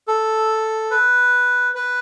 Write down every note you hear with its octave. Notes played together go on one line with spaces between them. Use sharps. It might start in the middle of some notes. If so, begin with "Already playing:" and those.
A4
B4
B4